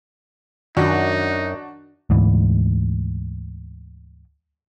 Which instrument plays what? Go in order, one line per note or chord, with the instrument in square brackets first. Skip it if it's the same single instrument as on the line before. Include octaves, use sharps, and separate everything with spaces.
[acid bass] F#2 [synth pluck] D#3 [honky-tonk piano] D4 F#4 [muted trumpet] D#4
[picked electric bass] D2 G#2 E3